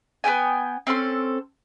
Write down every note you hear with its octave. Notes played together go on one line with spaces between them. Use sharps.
B3 C#4 G5 G#5
C4 C#4 A4 C6